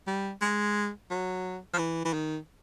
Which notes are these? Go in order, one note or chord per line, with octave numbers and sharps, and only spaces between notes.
G3
G#3
F#3
F3
E3
E3
D#3